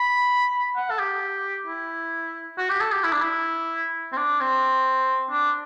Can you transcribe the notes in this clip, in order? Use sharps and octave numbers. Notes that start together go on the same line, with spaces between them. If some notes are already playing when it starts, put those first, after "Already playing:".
Already playing: B5
F#5
A4
G4
E4
F#4
G4
A4
G4
E4
D4
E4
C4
D4
C4
D4